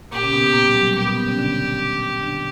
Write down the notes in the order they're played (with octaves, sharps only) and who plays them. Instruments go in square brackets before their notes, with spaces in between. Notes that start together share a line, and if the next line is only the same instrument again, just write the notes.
[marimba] A#2 A#3 [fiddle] G4
[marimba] C#3 C#4
B2 B3
B2 B3
A#2 A#3
G3
F#3
G3
[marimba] A#2 A#3 [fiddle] G4
[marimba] B2 B3
B2 B3
C#3 C#4
D3 D4
D3 D4